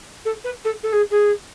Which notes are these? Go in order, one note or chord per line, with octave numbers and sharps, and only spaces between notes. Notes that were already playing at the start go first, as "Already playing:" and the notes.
A4
B4
A4
A4
G#4
G#4